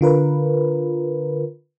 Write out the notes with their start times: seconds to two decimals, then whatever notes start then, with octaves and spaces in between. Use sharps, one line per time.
0.01 D3 F4 A#4 B4